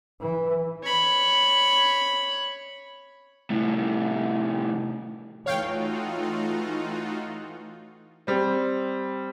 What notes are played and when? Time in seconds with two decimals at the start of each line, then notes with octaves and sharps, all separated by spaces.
0.21 E3
0.83 C#5 B5
3.50 C2 A2
5.46 E3 A3 D#4 F4 F#4 C#5 F5 G5
8.27 G3 C4